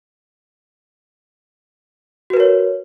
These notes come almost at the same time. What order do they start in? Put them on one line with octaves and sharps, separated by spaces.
F#4 B4 A#4 C#5